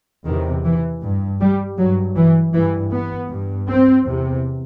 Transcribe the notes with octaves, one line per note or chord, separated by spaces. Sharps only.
E2 C3 D#3
E3
G2
G3
G2 F#3
E3
G2 E3
B3
G2
C4
E2 C3